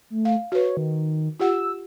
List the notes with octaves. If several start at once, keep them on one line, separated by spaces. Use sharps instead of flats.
A3
F5
F#4 B4 C#5
D#3
F4 G4 F#5 E6